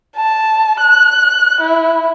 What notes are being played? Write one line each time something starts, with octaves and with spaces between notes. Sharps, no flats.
A5
F#6
E4